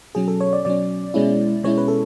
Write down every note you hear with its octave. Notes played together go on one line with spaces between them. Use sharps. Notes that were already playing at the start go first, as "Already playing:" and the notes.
B2 F#3 C#4 G#4
A4
C#5
D5
B2 F#3 C#4 D5
B2 G#3 C#4 E4
B2 G#3 C#4 E4 C#5
B4
A4